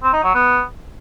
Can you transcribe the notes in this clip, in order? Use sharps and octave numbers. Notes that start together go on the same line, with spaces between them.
C4
D#4
F#3
B3